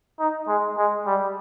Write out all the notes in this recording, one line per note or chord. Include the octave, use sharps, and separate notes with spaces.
D#4
G#3
G#3
G3